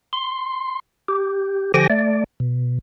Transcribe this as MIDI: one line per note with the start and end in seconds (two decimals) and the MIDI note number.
0.13 0.80 84
1.08 1.72 67
1.74 1.87 50
1.74 1.87 53
1.74 1.87 67
1.74 1.87 79
1.74 1.87 80
1.74 1.87 94
1.90 2.24 57
1.90 2.24 74
2.40 2.79 47